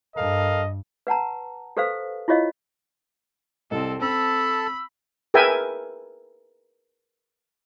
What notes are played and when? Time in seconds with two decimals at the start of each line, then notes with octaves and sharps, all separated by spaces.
0.16 G2 A4 A#4 D#5 F5
1.07 B4 F#5 A5 A#5
1.77 G4 A4 B4 C5 F5
2.28 E4 F4 G4 C#5 D#5 F5
3.71 C2 C4 A4 D#5
4.02 C4 A4 A5 B5 E6
5.34 G#4 A#4 B4 E5 G5 G#5